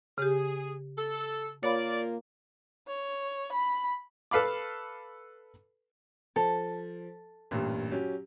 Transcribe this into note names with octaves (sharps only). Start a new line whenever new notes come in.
C#3 G4 G#4
A4
A#3 F4 C#5 D5 B5
C#5
B5
A4 B4 F5 B5 D6
F3 A4
A1 G2 A#2
F#3 C#4 G4